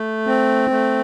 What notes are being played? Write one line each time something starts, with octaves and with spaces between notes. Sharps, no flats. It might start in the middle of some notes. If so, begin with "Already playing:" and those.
Already playing: A3
C4
A3